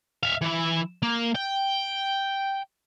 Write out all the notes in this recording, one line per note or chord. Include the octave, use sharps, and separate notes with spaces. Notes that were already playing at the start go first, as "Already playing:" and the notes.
E5 F5
E3 E4
A#3
G5